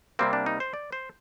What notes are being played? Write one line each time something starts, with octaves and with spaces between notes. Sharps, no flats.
C3 G3 A#3 C4
D4
D#4
C5
D5
C5